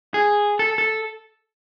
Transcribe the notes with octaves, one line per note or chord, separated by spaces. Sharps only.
G#4
A4
A4